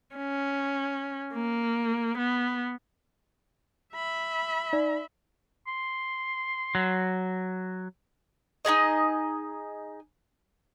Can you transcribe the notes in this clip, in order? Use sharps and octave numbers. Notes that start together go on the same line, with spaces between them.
C#4
A#3
B3
E5 B5
D#4 D5
C6
F#3
D#4 F#4 G#4 D#5